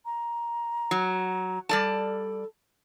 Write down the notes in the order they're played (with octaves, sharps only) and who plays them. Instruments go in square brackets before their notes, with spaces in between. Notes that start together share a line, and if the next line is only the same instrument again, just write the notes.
[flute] A#5
[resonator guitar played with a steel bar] F#3
[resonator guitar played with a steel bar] G3 D5 A5 [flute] A4